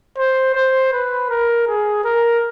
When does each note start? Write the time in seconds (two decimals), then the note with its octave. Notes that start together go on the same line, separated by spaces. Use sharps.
0.18 C5
0.55 C5
0.93 B4
1.30 A#4
1.68 G#4
2.05 A#4